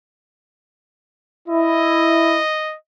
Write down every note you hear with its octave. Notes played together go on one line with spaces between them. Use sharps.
E4 D#5